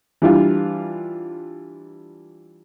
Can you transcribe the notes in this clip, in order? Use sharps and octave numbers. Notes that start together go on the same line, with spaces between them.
E3 G3 D4 F4